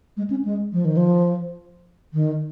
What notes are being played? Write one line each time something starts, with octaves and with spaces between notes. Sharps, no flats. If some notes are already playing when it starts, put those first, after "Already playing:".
G#3
C#4
G#3
F3
D#3
F3
D#3